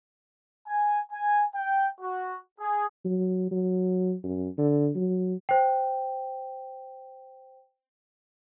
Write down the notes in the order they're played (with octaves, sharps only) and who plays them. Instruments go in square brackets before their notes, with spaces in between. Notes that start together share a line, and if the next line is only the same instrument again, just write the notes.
[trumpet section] G#5
G#5
G5
F#4
G#4
[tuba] F#3
F#3
F#2
D3
F#3
[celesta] C5 G5